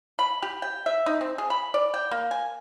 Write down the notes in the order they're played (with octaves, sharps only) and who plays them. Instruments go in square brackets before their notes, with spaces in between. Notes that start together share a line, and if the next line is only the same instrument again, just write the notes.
[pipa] B5
G4
G5
E5
D#4
C4
G#4
B5
D5
G5
A#3
G#5